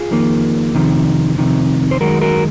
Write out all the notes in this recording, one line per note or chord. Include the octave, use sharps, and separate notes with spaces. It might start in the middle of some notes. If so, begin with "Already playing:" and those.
Already playing: F4 G#4
F2 D#3 A#3
F2 C3 D#3
F2 C3 D#3
C5
F#2 D#3 G#3 F#4 A#4
F#4 A#4